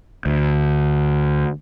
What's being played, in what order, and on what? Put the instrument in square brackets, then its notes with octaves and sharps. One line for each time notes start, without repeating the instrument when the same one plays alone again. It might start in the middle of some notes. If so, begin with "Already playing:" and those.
[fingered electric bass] D2